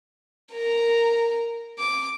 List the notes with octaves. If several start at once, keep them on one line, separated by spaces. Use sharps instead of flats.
A#4 A#5
D6